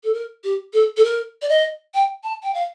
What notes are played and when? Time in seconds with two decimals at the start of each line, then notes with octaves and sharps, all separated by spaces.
0.04 A4
0.14 A#4
0.44 G4
0.73 A4
0.97 A4
1.04 A#4
1.42 D5
1.49 D#5
1.94 G5
2.24 A5
2.43 G5
2.54 F5